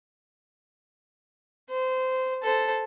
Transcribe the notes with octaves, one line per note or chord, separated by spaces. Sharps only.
C5
A4 C5